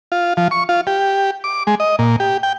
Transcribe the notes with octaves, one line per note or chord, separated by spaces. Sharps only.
F4
F3
C#6
F4
G4
D6
G#3
D#5
A#2
G4
G5